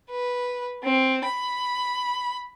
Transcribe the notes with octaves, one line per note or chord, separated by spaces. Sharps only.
B4
C4
B5